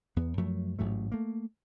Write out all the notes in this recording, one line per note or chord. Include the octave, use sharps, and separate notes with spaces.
E2 B3
F#2 F3 F#3 A3
A1 G#2 F#3 A3
A3 A#3